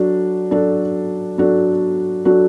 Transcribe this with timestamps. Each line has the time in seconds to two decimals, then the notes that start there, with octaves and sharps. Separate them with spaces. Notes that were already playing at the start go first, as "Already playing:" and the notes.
Already playing: F#3 D4 F#4 A4
0.51 F#3 D4 F#4 A4
1.38 F#3 D4 F#4 A4
2.25 F#3 D4 F#4 A4